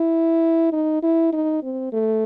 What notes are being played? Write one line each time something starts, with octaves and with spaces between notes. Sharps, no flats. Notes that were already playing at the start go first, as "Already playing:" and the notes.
Already playing: E4
D#4
E4
D#4
C4
A3